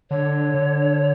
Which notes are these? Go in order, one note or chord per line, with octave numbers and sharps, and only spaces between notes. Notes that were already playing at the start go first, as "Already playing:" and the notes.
D3 C#5
D3